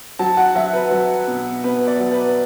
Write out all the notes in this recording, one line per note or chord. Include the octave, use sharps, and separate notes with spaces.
F#3 A5
F#5
F#3 E5
B4
F#3
B2
B2 B4
D5
F#3
B4